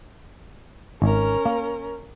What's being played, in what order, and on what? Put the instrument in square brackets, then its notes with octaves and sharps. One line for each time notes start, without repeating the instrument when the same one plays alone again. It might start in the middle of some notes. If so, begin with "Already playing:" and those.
[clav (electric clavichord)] G#1 [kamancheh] C#4 A#4
[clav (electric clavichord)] A#3